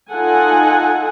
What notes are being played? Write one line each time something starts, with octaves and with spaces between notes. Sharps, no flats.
D#4 F4 A4 F#5 G#5